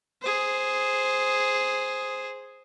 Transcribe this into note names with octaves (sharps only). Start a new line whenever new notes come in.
G#4 C5